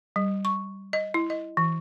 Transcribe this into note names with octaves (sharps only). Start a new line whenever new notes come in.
G3
C#6
D#5
E4
D#5
E3